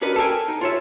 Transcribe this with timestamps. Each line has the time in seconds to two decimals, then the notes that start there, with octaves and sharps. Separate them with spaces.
0.01 C#4 D4 F#4 A#4 B4 D#5
0.16 A4 A#4 C#5 G5 G#5
0.48 D#4
0.61 F4 C#5 E5